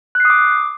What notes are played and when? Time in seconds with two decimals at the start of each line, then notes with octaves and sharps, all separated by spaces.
0.15 F#6
0.20 C7
0.25 D#6
0.30 D6